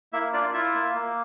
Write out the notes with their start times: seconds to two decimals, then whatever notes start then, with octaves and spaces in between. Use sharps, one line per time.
0.13 A#3 E4 E5
0.33 D4 F4 D5
0.54 E4 F4 E5
0.74 A#3
0.95 A#3